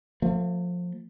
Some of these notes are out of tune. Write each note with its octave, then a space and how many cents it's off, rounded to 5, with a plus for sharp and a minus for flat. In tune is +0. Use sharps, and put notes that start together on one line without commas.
F3 +20 A3 +40